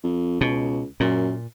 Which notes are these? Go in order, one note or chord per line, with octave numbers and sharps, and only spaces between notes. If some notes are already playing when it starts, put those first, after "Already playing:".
F2
C#2 B2
F#2 A#2